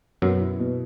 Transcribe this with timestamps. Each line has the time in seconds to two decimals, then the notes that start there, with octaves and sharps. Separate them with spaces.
0.22 F#2 B2 F#3
0.40 E4
0.59 B2